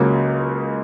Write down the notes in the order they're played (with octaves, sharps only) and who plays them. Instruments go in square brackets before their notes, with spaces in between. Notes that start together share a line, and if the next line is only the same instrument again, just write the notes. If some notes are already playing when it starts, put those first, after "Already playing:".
Already playing: [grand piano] C#2 C#3 F#3 A#3 C#4